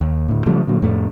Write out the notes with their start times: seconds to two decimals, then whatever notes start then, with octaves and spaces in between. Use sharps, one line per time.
0.01 D#2
0.28 D2 A2
0.46 C#3 F3 G3 A3
0.67 A#2 D3 F#3
0.82 F2 A2 A3